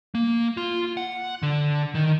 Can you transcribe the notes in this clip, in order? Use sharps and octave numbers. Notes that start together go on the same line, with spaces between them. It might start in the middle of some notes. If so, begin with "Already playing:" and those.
A#3
F4
F#5
D3
D#3